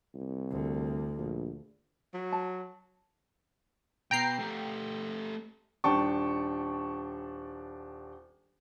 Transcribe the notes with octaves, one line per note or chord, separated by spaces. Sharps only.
C2
D2
A#1
F#3
A5
B2 B3 G5 A#5 C7
A3 G4
D#1 D4 G5 A5 C#6